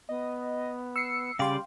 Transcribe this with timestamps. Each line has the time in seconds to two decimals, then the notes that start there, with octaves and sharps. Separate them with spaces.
0.09 B3 D#5
0.96 E6 C7 C#7
1.39 C#3 G3 D5 F5 G5 C6